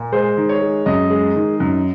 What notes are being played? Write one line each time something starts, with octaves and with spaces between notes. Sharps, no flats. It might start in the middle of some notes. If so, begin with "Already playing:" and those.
Already playing: A#2
G#3 C5
D#3
C#5
G#3
F#2 D#5
G#3
D#3
F#2